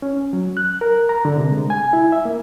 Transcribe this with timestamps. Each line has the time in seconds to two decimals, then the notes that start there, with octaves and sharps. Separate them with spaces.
0.02 C#4
0.33 F#3
0.57 F#6
0.81 A#4
1.09 A#5
1.25 D3
1.37 C3
1.51 G#3
1.70 G#5
1.93 E4
2.12 E5
2.25 A#3